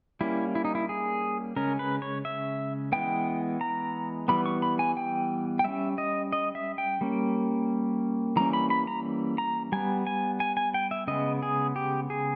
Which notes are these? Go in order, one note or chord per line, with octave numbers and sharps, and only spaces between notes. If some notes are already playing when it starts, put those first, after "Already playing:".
G3 A#3 C#4 E4
E4
D#4
E4
G#4
C#3 G#3 C#4 A#4
B4
C#5
E5
E3 G#3 B3 G5
A#5
E3 G3 B3 B5
C#6
B5
G#5
G5
G5
G3 C#4 E5
D#5
D#5
E5
G5
G3 A#3 C#4
E3 G3 A#3 C#4 A#5
B5
B5
A#5
A#5
G3 B3 G#5
G#5
G#5
G#5
G5
E5
C#3 G#3 B3 D#5
G#4
G4
G#4